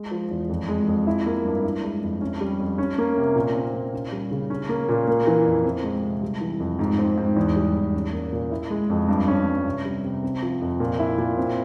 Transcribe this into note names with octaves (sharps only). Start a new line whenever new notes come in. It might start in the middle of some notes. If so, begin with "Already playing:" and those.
Already playing: G#3
F3
E2
F2
G#3
F2
E4
A#3
G2
E4
G#3
F2
C#4
G3
F2
C#4
A#3
C3
A#2
C4
A#2
C#4
G3
C#3
C#4
A#3
A#2
A#3
E3
F2
C4
G#3
C3
G3
E3
F2
G#2
C4
G#2
E2
G3
E2
C#4
A#3
A#2
E4
G#3
F2
G2
C#4
G2
C3
G3
C3
C4
F3
F2
A#2
E4
A#2
C4